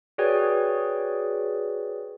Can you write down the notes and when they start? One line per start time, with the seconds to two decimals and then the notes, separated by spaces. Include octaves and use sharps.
0.18 F#4 G#4 B4 C#5 D5 G5